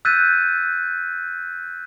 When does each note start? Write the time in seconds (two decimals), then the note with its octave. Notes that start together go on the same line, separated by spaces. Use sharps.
0.05 E6 F#6 G6 A6 B6 D#7